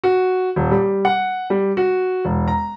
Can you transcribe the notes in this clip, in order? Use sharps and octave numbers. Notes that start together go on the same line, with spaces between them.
F#4
D#1
G3
F#5
G3
F#4
E1
A#5